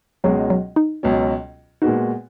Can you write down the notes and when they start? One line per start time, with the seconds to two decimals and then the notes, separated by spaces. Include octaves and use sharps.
0.24 C#2 B2 F#3 G#3 C#4 F#4
0.50 F#3
0.76 D#4
1.03 C#2 B2 F#3 C#4
1.82 A#2 G#3 B3 D#4 F#4